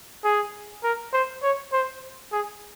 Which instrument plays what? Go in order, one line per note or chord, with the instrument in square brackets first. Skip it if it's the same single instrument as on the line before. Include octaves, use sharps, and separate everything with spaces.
[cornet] G#4
A#4
C5
C#5
C5
G#4